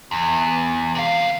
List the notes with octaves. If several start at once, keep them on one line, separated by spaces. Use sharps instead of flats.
E2
C3 F5